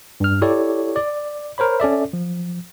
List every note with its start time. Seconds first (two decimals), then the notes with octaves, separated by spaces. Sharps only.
0.20 G2 F6
0.42 E4 G4 A4 C#5 D5
0.96 D5
1.58 A#4 C5 C#5 B5
1.80 C#4 A4 D5 E5
2.13 F3